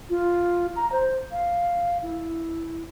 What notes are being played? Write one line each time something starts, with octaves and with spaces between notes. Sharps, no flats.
F4
A#5
C5
F5
E4